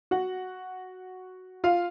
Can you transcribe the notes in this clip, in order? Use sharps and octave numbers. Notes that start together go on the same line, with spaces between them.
F#4 F#5
F4 F5